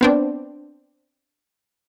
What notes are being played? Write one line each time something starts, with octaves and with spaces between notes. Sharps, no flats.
B3 C4 D4